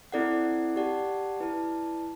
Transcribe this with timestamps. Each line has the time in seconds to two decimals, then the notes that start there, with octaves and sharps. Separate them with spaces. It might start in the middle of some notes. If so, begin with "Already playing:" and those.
0.12 C4 E4 A4 D5 F#5
0.76 G4 D5 F#5 A5
1.40 E4 B4 D5 A5